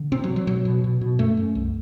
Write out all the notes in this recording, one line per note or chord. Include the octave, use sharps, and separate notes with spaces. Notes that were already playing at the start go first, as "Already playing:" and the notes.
Already playing: D3
C3 C4
F#3
C3
F#3
B2 F#3
B2
B2
B2
F#2 A3
F#2
C2